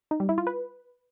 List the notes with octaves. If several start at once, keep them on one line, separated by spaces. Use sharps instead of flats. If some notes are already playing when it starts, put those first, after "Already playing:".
D#4
G3
E4
F4
B4